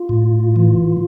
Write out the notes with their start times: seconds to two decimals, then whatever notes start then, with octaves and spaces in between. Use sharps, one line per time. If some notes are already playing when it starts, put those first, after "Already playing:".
Already playing: F4
0.09 A2
0.56 E3